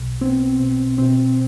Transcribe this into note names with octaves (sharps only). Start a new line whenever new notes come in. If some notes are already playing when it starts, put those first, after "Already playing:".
Already playing: B1 B2
B3 C4
B2
B2 C4